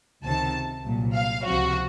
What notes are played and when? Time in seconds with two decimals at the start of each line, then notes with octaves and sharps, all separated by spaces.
0.23 C#2 C3 D#3 A5
0.85 C2 A#2 F#3
1.15 F5
1.46 C#2 C3 F3 F#4